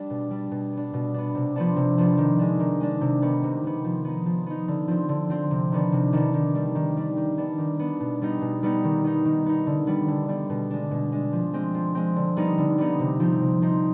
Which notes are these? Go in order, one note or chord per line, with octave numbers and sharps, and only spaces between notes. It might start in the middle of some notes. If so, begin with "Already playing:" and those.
Already playing: G3 D4
B2
G3 D4
B2
B3 D4
B2
B3 D4
C3
F3 B3 D4
C3
F3 B3 D4
D#3
G#3 D4
D#3
G#3 D4
C3
D#3 B3
C3
D#3 B3
F3
B3 D#4
F3
B3 D#4
D3
F3 C4
D3
F3 C4
C3
D#3 B3 D4
C3
D#3 B3 D4
D#3
G3 D4
D#3
G3 D4
D#3
B3 D4
D#3
B3 D4
B2
G3 B3 D#4
B2
G3 B3 D#4
D#3
B3 D#4
D#3
B3 D#4
D3
G3 B3
D3
G3 B3
B2
G#3 D4
B2
G#3 D4
F3
G#3 C4
F3
G#3 C4
D3
G3 B3 D#4
D3
G3 B3 D#4
C3
F3 C4 D#4
C3
F3 C4 D#4